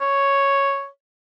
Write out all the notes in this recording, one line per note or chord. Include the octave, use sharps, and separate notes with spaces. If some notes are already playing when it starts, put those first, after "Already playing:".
C#5